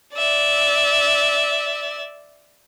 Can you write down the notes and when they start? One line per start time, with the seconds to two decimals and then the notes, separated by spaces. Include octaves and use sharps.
0.15 D5 E5